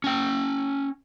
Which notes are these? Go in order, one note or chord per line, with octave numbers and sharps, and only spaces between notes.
C#4 G5